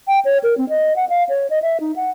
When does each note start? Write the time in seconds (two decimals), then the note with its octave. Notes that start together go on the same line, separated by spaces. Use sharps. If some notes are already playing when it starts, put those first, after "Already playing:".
0.08 G5
0.25 C#5
0.44 A#4
0.58 C4
0.69 D#5
0.96 F#5
1.09 F5
1.29 C#5
1.50 D#5
1.62 E5
1.80 D#4
1.96 F#5